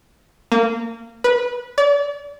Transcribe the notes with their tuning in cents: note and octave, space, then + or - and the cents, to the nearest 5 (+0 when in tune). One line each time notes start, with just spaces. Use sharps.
A#3 -25
B4 -15
D5 -35